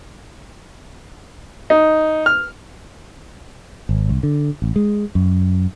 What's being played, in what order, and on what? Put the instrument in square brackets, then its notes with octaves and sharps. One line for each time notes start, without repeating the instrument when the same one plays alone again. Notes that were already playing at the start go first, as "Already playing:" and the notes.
[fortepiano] D#4
F6
[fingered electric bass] G#1
C2
D3
A1
G#3
F#2